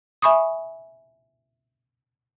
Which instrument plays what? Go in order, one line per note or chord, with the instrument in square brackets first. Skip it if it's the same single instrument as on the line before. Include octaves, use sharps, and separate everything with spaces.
[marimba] E5 G#5 B5 C#6 D#6